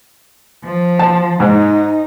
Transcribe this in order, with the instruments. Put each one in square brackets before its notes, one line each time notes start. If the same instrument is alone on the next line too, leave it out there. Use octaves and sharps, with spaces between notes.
[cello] F3
[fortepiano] A5
[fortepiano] G#2 [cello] D#4